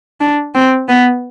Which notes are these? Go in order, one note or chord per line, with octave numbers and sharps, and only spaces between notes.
D4
C4
B3